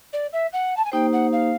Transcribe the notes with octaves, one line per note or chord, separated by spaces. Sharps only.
D5
E5
F#5
A5
G#5
A#3 D#4 G4 C5 G5
F#5
F5